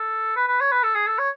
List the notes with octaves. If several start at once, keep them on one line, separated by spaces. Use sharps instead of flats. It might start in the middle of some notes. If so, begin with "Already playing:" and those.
Already playing: A4
B4
B4
C#5
B4
A4
G#4
A4
C#5